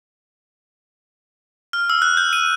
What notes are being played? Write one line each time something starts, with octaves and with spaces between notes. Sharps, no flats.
F6
E6
F#6
G6
D#7